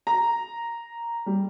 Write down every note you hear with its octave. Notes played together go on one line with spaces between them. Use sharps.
A#5
G3